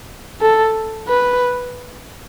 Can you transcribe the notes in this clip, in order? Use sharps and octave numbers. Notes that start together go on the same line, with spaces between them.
A4
B4